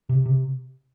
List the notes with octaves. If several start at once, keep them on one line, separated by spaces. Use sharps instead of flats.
C3
C3